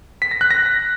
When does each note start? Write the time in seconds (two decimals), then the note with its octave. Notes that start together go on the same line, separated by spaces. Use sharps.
0.22 B6
0.31 A#6
0.41 F#6
0.51 A#6